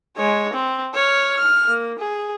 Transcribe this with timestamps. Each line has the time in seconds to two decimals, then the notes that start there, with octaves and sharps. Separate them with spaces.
0.16 G#3 C#5
0.53 C4
0.94 C#5 F6
1.36 F6
1.67 A#3
1.99 G#4